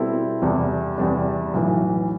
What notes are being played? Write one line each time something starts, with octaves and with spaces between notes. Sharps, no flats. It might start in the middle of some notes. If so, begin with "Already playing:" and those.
Already playing: B2 G3 C4 E4 A4
E2 C3 G3 D4
E2 C3 G3 D4
B1 A2 E3